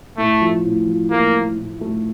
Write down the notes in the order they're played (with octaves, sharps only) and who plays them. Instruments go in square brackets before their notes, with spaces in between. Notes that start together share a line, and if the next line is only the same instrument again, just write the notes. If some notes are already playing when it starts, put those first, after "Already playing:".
[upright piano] A2 [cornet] A3
[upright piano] F3
A2
F3
[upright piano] A3 [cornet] A#3
[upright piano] A3
A2
A3